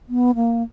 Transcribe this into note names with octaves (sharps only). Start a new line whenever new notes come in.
B3
A#3